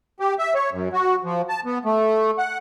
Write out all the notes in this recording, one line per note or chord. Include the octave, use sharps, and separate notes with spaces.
G4
E5
C#5
F#2
F#4
F3
A5
B3
A3
F#5